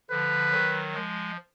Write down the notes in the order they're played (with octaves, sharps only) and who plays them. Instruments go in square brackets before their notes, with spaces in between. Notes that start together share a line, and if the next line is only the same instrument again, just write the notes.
[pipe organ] D3 F3 [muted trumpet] B4
[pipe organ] D#3 F#3
F3 G#3